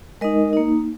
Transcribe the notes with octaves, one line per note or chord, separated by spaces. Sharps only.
G#3 D#4 A#4 D#5
A#3 D#4